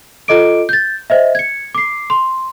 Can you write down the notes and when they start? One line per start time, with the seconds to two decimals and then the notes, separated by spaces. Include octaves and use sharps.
0.28 F4 A4 D#5 D6 D7
0.69 G6 A6
1.10 C5 D#5 E5
1.35 G#6 C#7
1.75 D6 C7
2.10 C6